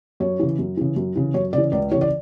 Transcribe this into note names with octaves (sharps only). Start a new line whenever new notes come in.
F#2 C#5
C#3 E3
F#2
C#3 E3
F#2
C#3 E3
F#2 C#5
C#3 E3 D5
C#2 D5
C#3 E3 C#5
D5